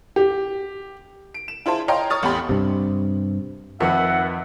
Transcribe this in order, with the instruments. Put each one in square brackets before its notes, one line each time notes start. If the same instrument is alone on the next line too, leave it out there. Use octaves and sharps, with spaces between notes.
[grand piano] G4
[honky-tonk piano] D7
E7
E4 F4 G#4 C5 A5
C#5 D#5 F5 G5 A#5 C6
C#5 C#6 D#6 F6 A6
A1 E2 G4 B5 C6
[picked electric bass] G2 C3
[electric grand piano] F2 [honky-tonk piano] D#3 B4 [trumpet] E5 [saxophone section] F#5